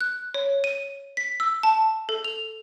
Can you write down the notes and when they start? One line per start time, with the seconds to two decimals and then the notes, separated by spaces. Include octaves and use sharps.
0.01 F#6
0.34 C#5
0.64 D#7
1.17 B6
1.40 E6
1.63 A5
2.09 A4
2.24 F7